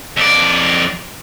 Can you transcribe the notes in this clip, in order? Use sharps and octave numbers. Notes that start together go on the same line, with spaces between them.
F2 D5